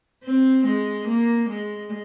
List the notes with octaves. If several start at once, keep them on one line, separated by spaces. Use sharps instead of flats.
C4
G#3
A#3
G#3